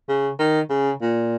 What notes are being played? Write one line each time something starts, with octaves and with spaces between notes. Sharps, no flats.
C#3
D#3
C#3
A#2